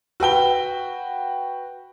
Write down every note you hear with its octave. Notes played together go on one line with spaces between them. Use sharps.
F#4 B4 G5 G7